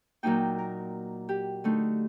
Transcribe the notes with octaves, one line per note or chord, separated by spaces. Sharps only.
A#2 F#3 A#3 D#4 G5
A#4
G4
D3 A3 D#4